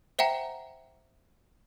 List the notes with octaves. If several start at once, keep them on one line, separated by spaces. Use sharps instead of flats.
C5 E5 F#5 G5 A#5